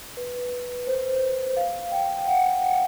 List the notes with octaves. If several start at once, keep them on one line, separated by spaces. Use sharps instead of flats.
B4
C5
F5
G5
G5
F#5